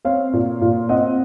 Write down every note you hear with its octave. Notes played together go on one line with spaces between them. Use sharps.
C4 C#5 F5
A#2
A#2
C4 D#5 F#5